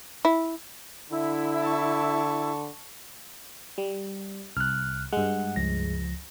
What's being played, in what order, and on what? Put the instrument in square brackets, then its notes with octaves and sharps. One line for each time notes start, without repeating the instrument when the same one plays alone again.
[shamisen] E4
[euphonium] D3 [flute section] E4
[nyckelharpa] A5 C#6
[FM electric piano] G3
[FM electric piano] C2 [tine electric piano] F6 F#6
[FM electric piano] G2 G#3 [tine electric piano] F#5
[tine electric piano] C#2 F3 A#6